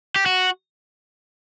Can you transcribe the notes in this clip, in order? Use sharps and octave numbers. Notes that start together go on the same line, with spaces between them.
G4
F#4